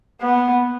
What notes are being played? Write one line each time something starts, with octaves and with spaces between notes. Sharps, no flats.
B3